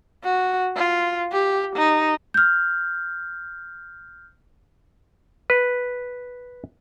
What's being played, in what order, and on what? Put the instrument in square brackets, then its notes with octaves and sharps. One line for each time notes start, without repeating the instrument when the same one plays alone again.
[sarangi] F#4
F4
G4
D#4
[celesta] F6 G6
[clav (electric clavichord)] B4